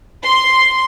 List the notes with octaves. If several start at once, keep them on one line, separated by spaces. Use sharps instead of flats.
C6